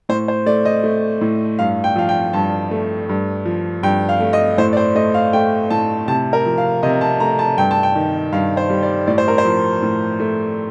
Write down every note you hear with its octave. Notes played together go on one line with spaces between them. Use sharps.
A2 C5
C5
A3 D5
D#5
A3
A2
G2 F5
G5
F3 F5
G5
G2 A5
A3
G2
F3
G2 G5
F5
A3
D#5
A2 C5
D5
C5
A3 D#5
F5
A3 G5
A2 A5
C3 A5
A#4
F3
F5
C3 D#5
A5
A3 A#5
A5
G2 G5
A5
G5
D#3
G2 F5
C5
G3
D5
A2 D5
C5
A#4
C5
F3
A2
A3